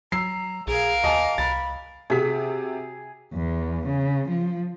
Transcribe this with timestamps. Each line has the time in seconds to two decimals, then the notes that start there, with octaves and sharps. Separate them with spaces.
0.12 F#3 A#5 E6 C7
0.67 B1 G#4 A#4 F5
1.04 D#2 D#5 G#5 A5 D6
1.38 C2 B5 A6
2.10 C3 F#4 G#4 B6
3.33 E2
3.86 C#3
4.28 F3